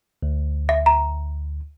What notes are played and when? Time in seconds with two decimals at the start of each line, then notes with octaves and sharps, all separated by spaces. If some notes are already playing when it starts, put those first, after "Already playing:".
0.23 D2
0.69 E5
0.86 A#5